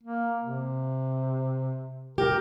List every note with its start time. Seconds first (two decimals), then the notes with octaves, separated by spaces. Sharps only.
0.03 A#3
0.44 C3
2.18 G4 A#4